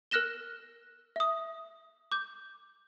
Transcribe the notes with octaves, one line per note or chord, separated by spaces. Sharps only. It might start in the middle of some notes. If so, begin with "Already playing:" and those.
A#4 F6 F#6 A#6 E7 G7
E5 D#6
D6 G6